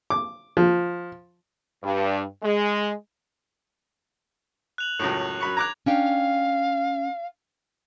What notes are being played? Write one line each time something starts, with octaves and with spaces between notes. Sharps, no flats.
D6
F3
G2
G#3
F#6 F7 F#7
C#2 F#2 A2
F#2 B5 C#6
A#5 D6 F#6 G#6 F7
C#4 D4 F5 G5